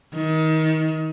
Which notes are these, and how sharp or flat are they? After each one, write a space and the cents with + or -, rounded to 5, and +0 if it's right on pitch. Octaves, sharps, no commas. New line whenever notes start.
D#3 +25